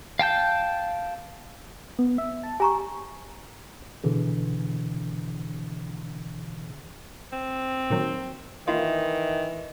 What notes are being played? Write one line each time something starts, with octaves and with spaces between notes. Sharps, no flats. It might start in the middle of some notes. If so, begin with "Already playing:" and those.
F5 G5 A5 G6
B3
E5
A5
G4 G#5 A#5 C#6
B2 D3 E3 G#4
C4
A#2 D#3 F#3
D#3 E3 A#3 E4 F4